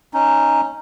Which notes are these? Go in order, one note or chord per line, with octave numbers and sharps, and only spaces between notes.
C#4 D#4